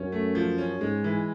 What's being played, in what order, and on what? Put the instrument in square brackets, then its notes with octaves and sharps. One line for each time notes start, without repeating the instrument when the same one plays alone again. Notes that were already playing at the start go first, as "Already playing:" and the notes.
Already playing: [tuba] F#2 [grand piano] C#4
[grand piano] A3
F3
C#4
[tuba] G#2 [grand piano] G#3
[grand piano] E3